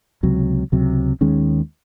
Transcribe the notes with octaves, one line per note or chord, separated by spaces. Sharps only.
C#2 C3 F#3
C#2 C3 F#3
D#2 D#3 G#3 C#4